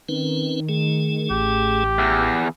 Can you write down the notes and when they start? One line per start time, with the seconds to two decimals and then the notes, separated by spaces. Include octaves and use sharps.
0.09 D#3 C4 C#4 B4
0.69 A3 G#4
1.30 A1 G4
1.99 E2